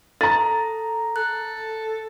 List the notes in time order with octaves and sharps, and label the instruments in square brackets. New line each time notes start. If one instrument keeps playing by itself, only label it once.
[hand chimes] A4 [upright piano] A#5 A6
[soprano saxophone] A4 [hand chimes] F#6